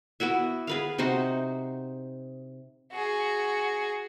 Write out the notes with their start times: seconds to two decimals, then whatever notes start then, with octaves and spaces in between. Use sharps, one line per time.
0.20 B3 E4 F#4 E5
0.67 G#4 B4 F5
0.98 C3 D#4 F#4 C5
2.92 F#4 G#4